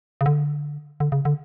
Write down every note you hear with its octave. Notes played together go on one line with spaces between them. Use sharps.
C#3
D3
D3
C#3
D3